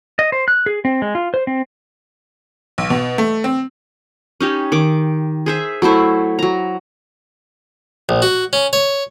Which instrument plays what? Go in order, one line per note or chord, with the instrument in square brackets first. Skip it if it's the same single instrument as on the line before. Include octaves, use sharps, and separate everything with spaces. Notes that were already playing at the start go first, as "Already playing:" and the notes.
[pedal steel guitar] D#5
C5
F#6
G#4
C4
G#3
F4
C5
C4
[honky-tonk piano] B1
B2
A3
C4
[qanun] C#4 D#4 G4
D#3 D6
G#4 C5 E5
F#3 A3 E4 C5
F#3 A#5
[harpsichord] A#1
F#4
C#4
C#5